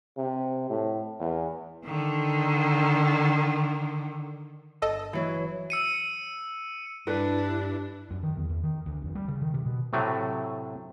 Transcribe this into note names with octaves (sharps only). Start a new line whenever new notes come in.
C3
A2
E2
D3 D#3
G1 A4 D#5
E3 F#3
E6 C#7 D#7
G2 D4 E4 B4
F#2
D#3
E2
E2
D#3
D2
F1
G3
C#3
D#3
C3
B2
A2 C3 F#3 A3